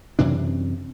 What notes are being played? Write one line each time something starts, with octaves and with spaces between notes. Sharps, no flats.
F#2 C3 E3 D4